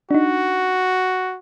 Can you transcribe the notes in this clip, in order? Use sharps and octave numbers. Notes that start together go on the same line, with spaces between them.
D4 D#4 F#4